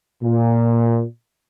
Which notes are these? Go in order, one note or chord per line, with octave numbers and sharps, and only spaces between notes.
A#2